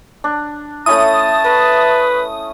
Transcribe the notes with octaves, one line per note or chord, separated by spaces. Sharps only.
D4
A3 C#4 E4 A5 D#6
B4